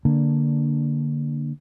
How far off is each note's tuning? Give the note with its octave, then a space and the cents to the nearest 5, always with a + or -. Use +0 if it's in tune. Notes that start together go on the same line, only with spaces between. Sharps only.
D3 +0 A#3 +0 D4 -5